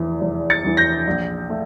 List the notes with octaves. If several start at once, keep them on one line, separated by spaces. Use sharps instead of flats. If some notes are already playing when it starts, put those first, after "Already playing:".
Already playing: F1 E2 E3
F1
A6 C#7
E2 E3
G6 A#6
A#1
A3